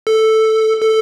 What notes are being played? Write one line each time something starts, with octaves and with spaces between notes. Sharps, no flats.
A4
A4